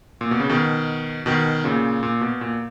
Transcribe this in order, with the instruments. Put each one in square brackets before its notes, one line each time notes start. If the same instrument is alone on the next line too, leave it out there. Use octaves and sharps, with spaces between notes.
[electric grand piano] A#2
B2
C#3
B2 D#3
B2 D#3
A#2 C#3
A#2
B2
A#2